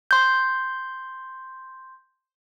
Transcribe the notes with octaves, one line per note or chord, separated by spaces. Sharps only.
C6 G6